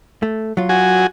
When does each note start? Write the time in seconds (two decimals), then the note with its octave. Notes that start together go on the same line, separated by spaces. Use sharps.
0.23 A3
0.57 F#3 F4
0.69 F#4 G#5